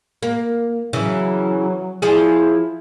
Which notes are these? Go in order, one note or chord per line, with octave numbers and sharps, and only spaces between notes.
A#3
C#3 E3 F#3
F3 E4 G#4